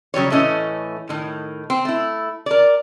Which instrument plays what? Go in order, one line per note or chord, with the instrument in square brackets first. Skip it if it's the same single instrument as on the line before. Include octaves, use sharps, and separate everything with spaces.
[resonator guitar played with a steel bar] C#3 F#3 G3 C#5
A2 E3 A3 C#4 D#5
A2 D#3
C4
A3 E4
A#4 D5